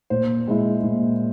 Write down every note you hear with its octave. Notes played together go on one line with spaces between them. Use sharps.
A#2 C5
G#3 E4
A#2